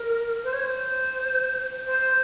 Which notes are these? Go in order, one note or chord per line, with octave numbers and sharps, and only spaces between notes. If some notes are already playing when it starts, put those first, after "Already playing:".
Already playing: A#4
C5
C#5
C5
C5